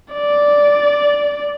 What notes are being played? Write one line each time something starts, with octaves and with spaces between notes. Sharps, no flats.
D5